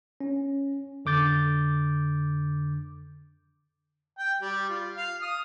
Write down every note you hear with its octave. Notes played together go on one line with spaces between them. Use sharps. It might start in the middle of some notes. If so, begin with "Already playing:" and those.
C#4
F2 D3 D6 G6 A6
G5
G3
F4
F5
D#6